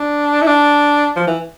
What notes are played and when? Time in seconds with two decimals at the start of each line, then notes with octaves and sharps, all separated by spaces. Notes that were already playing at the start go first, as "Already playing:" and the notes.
Already playing: D4
0.42 E4
0.47 D4
1.16 F3
1.27 E3